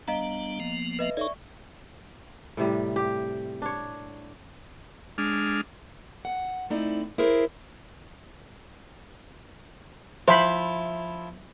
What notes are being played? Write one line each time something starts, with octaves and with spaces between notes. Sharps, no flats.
G3 B3 D4 D#5 F5 A#5
F3 A#3 B3
B4 D#5 E5
D#4 A4 C#5 D5 E5 C#6
A2 C3 G3
G4
D4 C#5
G#3 D4 F6
F#5
A3 C4 D#4 E4 D5
E4 G#4 A#4 C5
F3 E4 C5 B5